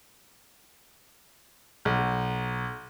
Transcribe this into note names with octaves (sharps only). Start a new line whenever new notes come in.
B1